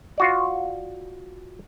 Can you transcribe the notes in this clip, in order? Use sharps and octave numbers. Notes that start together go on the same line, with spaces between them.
F4 F#4 D5